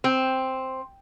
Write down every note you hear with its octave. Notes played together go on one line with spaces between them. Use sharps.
C4